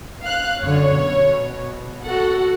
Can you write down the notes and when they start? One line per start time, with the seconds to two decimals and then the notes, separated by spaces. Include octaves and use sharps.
0.22 F5 F#6
0.60 F#2 D3 C#5
0.95 B2
2.04 F#4 A4 F#5